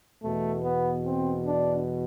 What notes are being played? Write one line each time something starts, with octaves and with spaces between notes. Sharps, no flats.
E2 B2 A3
B3
C4
D4